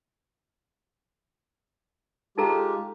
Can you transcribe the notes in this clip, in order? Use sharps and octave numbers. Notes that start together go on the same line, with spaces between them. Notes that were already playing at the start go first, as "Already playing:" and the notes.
G#3 D#4 F4 G4 A4 A#5